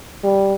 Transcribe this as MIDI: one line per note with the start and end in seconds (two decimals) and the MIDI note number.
0.24 0.54 55